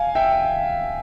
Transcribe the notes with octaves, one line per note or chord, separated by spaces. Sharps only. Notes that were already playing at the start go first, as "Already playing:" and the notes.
Already playing: F5 G#5
E5 G5